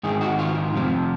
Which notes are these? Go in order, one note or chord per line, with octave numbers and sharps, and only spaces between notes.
G#2 D#3 G#4
F#4
F4
F2 C3 F3